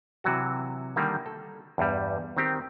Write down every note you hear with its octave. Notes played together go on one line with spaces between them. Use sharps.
C3 E3 F#3 F#4
D3 D#3 G3 A#3
A4
E2 G2 G3
D#3 C4 G4